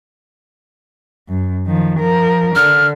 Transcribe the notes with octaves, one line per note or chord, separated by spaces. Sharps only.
F#2
D#3 F3
F3 A#4
D3 F6